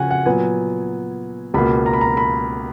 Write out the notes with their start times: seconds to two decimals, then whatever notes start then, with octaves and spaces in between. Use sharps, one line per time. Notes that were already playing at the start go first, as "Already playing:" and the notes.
Already playing: C#3 F3 F#4 F#5 G#5
0.11 F#5
0.26 A#2 F#3 B3 G#5
1.54 C#2 B2 A#3 B5
1.86 A#5
1.93 B5
2.01 A#5
2.17 B5